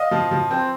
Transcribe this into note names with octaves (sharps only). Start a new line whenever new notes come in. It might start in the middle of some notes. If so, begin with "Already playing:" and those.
Already playing: D#5 F5
F3
F3
C4